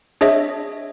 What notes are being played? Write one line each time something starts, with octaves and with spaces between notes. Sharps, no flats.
D4 G#4 C#5 D#5 E5